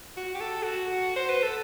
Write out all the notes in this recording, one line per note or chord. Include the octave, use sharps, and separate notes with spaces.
F#4
G4
A4
F#4
C5
B4
A4